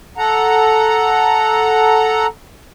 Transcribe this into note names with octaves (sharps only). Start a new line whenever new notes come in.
A4 F#5 A#5